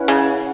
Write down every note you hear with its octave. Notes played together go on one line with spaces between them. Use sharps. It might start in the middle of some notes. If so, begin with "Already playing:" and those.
Already playing: C#4 E4 B4 F#5
C#3
F#5